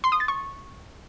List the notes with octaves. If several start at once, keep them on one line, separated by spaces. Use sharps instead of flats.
C6
D#6
A6
C#6